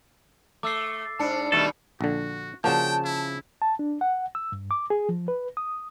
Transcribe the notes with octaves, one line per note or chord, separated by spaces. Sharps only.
A3 D6 E6 C7
G#2 D4 A5 C#7
B2 D#3 G3 A3 A4
A#1 D3 F#4
C#3 F3 A#3 F#4 G5 A5
E4
A5
D4
F#5
E6
G2
D6
G#4
F3
B4
D#6